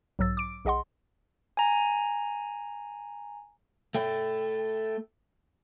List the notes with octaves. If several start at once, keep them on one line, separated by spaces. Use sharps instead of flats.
B1 G#2 F#3 E6 A6
D6 D7
B1 G#4 D#5 F#5 C6
G#5 A#5
A3 G5